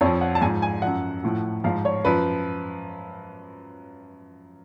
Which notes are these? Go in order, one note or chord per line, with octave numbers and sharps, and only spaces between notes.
F2 F3 C#5
F#5
A5
G#2 F3 G#5
G#5
F#2 F3 F#5
A2 F3
G#2 F3 F5
C#5
F#2 F3 B4